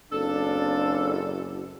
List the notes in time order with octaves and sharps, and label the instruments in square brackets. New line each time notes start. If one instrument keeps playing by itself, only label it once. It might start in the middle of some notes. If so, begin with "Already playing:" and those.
[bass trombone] F#1 [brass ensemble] C4 D5 F5 [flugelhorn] D4 [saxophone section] A4